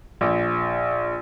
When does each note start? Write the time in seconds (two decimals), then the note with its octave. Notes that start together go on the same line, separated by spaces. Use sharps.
0.21 A#1